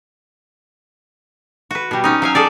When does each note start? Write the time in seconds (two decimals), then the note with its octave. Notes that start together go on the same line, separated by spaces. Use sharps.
1.71 F#4 B4
1.91 B2 G3
2.04 C#4 D#4
2.22 F#3 F5 G#5
2.35 G#4 A4 D5